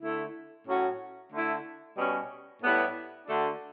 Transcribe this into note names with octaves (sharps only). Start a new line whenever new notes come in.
D3 A3 E4
A2 F#3 C#4 F#4
D3 A3 E4
B2 G3 C#4
A2 G3 B3 E4
D3 A3 D4 F#4